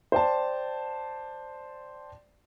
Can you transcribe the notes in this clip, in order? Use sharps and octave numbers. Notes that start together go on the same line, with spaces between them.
C5 D5 G5 A5